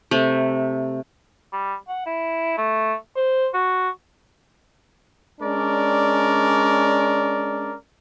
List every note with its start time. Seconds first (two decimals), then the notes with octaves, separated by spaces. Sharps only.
0.11 C3 A3
1.53 G3
1.89 F#5
2.06 E4
2.58 A3
3.16 C5
3.54 F#4
5.41 G#3 C#4 D4 A#4 D5